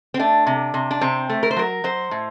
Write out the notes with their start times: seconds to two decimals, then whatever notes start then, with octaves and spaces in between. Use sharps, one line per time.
0.14 C4
0.19 A3 D4
0.47 C3
0.74 C3
0.91 D4
1.01 C3 C4
1.29 A3
1.43 A#4
1.51 C5
1.56 F#3 A#4
1.84 F#3 C5
2.11 A2